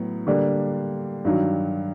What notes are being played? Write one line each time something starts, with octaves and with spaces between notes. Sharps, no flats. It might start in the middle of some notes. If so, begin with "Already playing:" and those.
Already playing: A2 F#3 B3
D3 G3 A#3 D4
G2 D#3 F#3